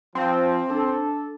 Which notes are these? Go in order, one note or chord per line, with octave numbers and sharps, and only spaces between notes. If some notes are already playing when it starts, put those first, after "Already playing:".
F3 C4
D4 A4